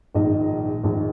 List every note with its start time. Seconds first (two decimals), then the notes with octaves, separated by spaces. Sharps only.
0.15 A#1 G#2 D#3 D#5
0.84 A#1 G#2 D#3